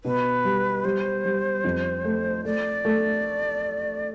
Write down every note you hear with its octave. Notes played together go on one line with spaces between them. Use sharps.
B2 B4
G3
G3 C5
G3
F2
A3
A3 D5
A3